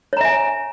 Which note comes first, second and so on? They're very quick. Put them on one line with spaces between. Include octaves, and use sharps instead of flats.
C#5 A#5 E5 G#5